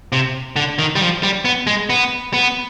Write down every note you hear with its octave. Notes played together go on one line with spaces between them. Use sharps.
C3
D3
D#3
G3
F3
G3
B3
G#3
B3
B3